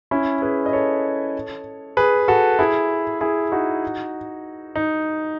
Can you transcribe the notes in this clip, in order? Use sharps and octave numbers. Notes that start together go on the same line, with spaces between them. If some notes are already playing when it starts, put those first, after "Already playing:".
C#4 E4
G#4 B4
D#5
A4 C#5
G#4 B4
F#4 A4
E4 G#4
E4 G#4
D#4 F#4
D#4